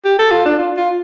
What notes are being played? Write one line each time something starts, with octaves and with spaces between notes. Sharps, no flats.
G4
A4
F4
D4
F4
F4